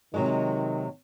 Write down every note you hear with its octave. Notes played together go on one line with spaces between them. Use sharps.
C3 D#3 F#3 G#3